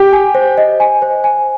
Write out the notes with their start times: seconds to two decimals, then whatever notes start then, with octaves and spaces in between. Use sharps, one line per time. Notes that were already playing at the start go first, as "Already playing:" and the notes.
Already playing: G4 G5
0.13 G#5
0.35 C5
0.57 D#5
0.80 G#5
1.02 C5
1.24 G#5